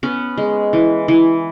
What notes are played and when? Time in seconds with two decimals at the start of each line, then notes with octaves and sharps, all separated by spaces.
0.03 B3 C#4
0.38 G#3
0.73 E3
1.08 E3